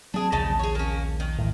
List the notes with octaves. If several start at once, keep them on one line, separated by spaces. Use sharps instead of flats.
F#3 B3 C4 D4 G#4
A#1 D#2 C#3 D#4 A5
G#4 C#5
A#3 C#4
D#3 D#4
A2 D3 E3